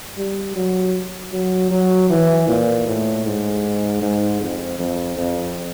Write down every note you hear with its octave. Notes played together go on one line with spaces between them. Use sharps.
G3
F#3
F#3
F#3
E3
A#2
A2
G#2
G#2
F2
F2
F2